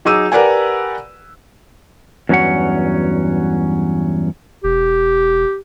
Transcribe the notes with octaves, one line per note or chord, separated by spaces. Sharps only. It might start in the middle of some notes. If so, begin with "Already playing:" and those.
F#3 D#4 G#4 D6 E6 D#7
G4 A#4 B4 D5 F#5 G#5
E2 G2 F#3 C#4 F#4 F#5
E1 G4